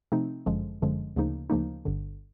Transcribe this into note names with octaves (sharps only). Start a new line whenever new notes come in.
C3 F3 A3 C4 D#4
G1 F#2 D3 F3 G#3
G1 F#2 D3 F3 G#3
D2 C#3 F3 A#3 D#4
D2 C#3 F3 A#3 D#4
G1 G2 D3